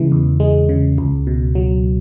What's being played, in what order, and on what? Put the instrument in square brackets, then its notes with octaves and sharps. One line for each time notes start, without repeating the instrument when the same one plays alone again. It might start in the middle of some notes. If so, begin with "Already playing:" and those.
Already playing: [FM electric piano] C#3 E3 G#3
E2
G#3
C#3
C#2
B2
F#3